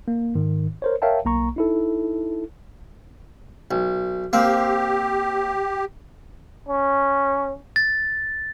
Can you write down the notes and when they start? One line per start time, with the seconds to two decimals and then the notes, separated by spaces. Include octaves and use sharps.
0.08 A#3
0.35 G#2 D#3
0.82 A#4 C5 C#5
1.02 A#4 C#5 E5 F5 G5 A5
1.25 B1 A#3 A#5 C#6
1.56 D#4 E4 A4
3.71 B1
4.33 A#3 C4 G4
6.69 C#4
7.76 A6